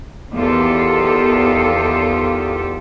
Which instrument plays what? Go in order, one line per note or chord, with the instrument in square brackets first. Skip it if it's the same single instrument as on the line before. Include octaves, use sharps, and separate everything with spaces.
[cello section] E2 D#3 F4 G4 A4